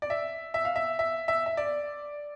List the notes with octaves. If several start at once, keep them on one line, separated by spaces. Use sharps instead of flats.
D5
E5
E5
F5
E5
E5
E5
E5
D5